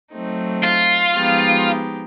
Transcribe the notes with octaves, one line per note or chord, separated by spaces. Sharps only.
F#3 A3 C4 D#4
F4
F3 G#3 B3 D#4 G4